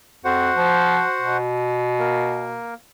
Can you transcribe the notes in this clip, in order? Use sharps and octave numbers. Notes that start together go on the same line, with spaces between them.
F2 F#4 C5 F#5
F3
B2
A#3 A#4